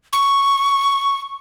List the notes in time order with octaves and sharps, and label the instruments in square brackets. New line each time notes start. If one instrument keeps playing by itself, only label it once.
[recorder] C#6